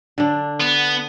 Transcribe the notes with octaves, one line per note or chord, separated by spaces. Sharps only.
D3 D4
B3